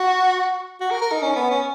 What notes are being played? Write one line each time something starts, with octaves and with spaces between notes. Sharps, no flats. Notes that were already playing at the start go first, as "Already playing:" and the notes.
Already playing: F#4
F#4
A#4
A#4
D#4
C#4
B3
C#4